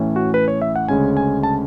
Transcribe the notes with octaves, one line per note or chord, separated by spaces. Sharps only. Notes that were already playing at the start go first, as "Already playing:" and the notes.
Already playing: A2 E3 A3 C#4
F#4
B4
C#5
E5
F#5
D2 C#3 G#3 C#4 G#5
G#5
A5